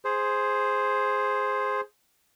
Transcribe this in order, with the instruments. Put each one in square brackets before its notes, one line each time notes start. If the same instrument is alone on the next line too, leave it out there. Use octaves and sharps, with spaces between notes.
[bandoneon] G#4 C5